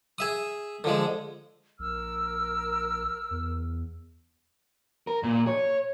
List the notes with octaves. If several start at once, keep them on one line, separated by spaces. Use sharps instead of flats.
G#4 E5 D#6
D3 F3 G#3
A#1 A#4 E6 F6
E2
A#4
A#2
C#5